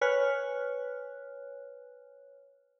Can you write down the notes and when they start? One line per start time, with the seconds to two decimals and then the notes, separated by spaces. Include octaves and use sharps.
0.01 B4 C#5 G#5 F6 F#6